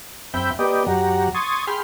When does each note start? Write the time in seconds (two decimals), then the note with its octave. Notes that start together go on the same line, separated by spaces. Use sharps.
0.34 F#2 C4 E5 G5 B5 G6
0.59 A#3 G4 B4 D5 D#5 G5
0.87 F#2 F#3 G4 F#5 A#5
1.34 C6 C#6 D#6 G#6 A6
1.67 G#4 G5 B5 C6 F6